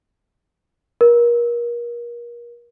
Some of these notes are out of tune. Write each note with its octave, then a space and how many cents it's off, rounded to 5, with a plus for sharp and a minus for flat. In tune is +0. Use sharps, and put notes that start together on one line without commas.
A#4 +35